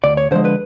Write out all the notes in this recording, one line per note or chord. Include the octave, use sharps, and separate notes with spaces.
D2 D5
C#5
D3 F3 G#3 C5
B4